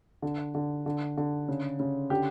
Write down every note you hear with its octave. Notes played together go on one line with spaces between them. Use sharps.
D3
D3
D3
D3
C#3
C#3
D3 G4